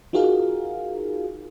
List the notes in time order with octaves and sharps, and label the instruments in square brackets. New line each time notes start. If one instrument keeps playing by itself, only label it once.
[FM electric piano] D#4 F4 F#4 G#4 A#4 F5